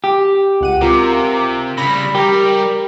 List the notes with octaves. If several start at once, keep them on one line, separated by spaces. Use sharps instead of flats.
G4
C#2 F#5 D#7
C3 F4 A#4 D6
C#3 G3 B5 A#6
G3 G4 A#4